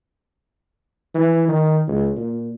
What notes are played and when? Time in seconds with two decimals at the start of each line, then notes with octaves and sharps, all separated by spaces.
1.15 E3
1.49 D#3
1.88 C#2
2.17 A#2